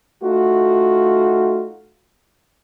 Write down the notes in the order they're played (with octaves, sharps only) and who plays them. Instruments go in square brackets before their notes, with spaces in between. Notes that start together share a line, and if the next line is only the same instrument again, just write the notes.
[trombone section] A3 D#4 F4 F#4